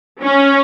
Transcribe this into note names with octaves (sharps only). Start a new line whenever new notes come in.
C#4